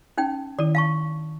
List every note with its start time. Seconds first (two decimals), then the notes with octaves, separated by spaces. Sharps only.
0.18 C#4 D#4 G5
0.59 D#3 E4 D5
0.75 F5 A5 C#6